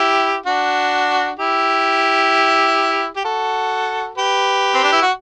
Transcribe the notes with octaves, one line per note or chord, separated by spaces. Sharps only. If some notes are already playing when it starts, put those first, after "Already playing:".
Already playing: E4 G4
D4 F#4
E4 G4
G4
F#4 A4
G4 B4
C4
D4
E4
F#4